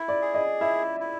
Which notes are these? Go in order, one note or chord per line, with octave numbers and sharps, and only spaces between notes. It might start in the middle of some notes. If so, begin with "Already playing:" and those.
Already playing: E4
D5
G#4
D#5
E4 E5
E4